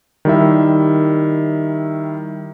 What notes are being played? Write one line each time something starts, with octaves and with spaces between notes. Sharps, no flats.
D#3 G3 E4 E5